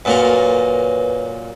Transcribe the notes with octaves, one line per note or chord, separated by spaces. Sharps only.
F#2 A#2 A#4 B4 C#5